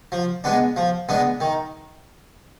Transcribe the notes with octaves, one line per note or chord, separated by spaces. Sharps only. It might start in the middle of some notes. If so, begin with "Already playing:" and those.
F3
G#3 B3 D4
F3
G#3 B3 D4
D#3